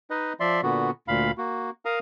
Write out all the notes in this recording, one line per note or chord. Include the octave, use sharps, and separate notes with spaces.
D#4 B4 D#5
F3 D5 E5 C6
A#2 D3 B3 F#4
D2 A#2 F5 B5
A#3 F#4
A#4 F5 A#5 D#6